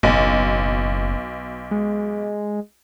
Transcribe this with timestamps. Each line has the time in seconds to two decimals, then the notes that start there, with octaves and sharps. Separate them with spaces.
0.03 F#1 B1
1.71 G#3